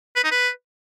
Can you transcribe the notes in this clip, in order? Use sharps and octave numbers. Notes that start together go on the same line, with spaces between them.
B4
D#4
B4